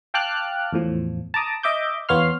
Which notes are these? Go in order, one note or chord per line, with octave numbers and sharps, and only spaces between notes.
F5 G5 A5 D6 F6 F#6
E2 A2 F3
A5 A#5 D6 D#6
D#5 E5 D6 G6
E2 B3 C#5 F5 C6 F6